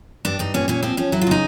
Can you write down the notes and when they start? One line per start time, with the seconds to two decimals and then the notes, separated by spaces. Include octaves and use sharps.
0.25 G2 D4
0.39 G2 D#4
0.54 A#2 C#4
0.68 A#2 C#4
0.83 F3 C4
0.97 F3 C#4
1.12 F#3 E4
1.21 F4
1.27 C#3 D#4